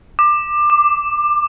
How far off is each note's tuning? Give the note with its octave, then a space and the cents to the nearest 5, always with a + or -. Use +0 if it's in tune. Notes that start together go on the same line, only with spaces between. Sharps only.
D6 +20
D6 +0